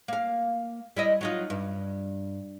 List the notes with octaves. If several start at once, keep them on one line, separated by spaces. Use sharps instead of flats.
A#3 F5
G3 E4 D#5
F#3 D#4 F4
G2